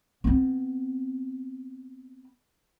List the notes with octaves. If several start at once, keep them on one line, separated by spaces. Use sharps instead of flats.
B3 C4